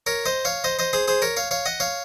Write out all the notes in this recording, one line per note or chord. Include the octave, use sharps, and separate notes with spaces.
A#4 C#5
C5 D#5
C#5 F5
C5 D#5
C5 D#5
G#4 C5
G#4 C5
A#4 C#5
C#5 F5
C#5 F5
D#5 F#5
C#5 F5